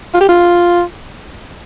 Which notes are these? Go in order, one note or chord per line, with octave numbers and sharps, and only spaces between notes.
F4
G4
F4